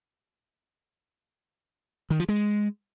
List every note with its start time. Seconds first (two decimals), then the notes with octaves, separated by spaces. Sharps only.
2.10 D#3
2.20 F3
2.29 G#3